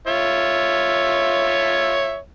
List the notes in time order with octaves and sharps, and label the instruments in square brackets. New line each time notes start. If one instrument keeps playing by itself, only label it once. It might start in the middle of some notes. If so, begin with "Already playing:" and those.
[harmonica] F4 C#5 E5